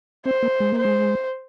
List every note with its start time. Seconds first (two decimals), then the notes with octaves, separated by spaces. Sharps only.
0.25 C4 C5
0.43 A#3
0.60 G#3
0.73 A#3
0.78 C5
0.85 G#3